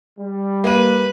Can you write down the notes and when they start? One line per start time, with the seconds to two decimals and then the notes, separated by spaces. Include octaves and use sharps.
0.19 G3
0.64 A#3 B4 D#7